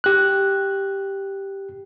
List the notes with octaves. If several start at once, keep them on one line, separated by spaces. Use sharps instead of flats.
G4 F#6